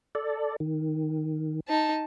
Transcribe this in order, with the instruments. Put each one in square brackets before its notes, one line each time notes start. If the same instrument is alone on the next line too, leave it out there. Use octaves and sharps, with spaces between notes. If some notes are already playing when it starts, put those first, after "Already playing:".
[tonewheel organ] A4 D5
D#3
[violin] D#4 A5